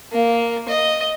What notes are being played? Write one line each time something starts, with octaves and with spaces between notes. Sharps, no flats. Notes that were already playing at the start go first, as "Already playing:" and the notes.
A#3
D#5